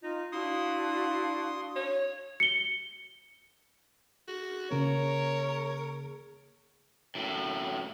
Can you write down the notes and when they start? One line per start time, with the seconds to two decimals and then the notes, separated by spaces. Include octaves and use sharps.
0.03 D#4 F4
0.32 D4 E4 F#4 F5 C6 D#6
1.76 C#5
2.40 C#7 G7
4.28 F#4 G#4
4.71 C#3 A#3 A#4 C#5
7.15 F#2 A2